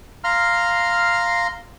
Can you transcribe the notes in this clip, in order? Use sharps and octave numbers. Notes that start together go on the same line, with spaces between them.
F5 A#5 C6 F6